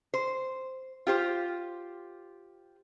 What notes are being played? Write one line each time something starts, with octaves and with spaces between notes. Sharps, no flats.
C5
F4 G4 C5